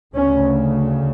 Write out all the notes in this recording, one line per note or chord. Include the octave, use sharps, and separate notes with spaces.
D2 C#3 C#4